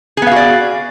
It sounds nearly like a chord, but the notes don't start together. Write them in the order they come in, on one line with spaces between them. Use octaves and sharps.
G#4 B3 F5 F#4 D5